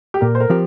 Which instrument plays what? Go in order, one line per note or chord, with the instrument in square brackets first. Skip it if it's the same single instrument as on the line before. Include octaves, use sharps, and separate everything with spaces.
[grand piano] G4
[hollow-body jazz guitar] A#2 [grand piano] A#4
[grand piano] C5
A#4
[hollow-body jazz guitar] F3 C4 G4